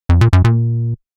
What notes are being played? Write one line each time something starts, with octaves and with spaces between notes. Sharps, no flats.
F2
A#2
F#2
A#2